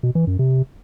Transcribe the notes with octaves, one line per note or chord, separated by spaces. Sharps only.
B2
E3
F#2
C3